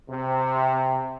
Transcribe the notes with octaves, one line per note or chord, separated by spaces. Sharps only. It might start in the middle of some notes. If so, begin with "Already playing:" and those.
C3